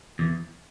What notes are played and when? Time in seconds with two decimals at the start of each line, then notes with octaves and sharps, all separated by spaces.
0.19 E2